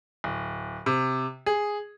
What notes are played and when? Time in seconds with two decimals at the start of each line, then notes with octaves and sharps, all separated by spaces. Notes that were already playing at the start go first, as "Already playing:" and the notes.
0.24 D1
0.86 C3
1.46 G#4